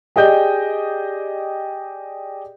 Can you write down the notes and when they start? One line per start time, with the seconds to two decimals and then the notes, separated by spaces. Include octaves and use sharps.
0.16 G4 G#4 D5 D#5 G5 G6